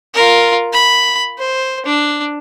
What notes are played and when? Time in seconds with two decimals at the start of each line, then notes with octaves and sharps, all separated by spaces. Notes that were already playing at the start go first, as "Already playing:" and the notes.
0.15 F4 A#4
0.73 B5
1.38 C5
1.86 D4